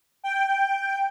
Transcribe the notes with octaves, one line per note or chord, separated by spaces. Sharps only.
G5